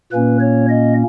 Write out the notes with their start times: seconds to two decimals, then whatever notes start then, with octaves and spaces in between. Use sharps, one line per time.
0.12 A#2 A#3 C#4 B4
0.40 C#5
0.69 D#5